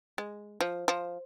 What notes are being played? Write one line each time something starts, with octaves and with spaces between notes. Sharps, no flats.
G#3
F3
F3